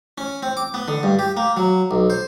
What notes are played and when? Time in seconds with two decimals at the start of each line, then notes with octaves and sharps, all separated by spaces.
0.18 C#4
0.43 C4
0.57 D6
0.74 B3
0.88 D3
1.03 G2
1.19 G4
1.37 A#3
1.57 F#3
1.91 B1
2.10 C5